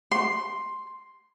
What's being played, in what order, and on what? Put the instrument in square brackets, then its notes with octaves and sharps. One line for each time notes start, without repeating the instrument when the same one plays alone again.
[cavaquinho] C6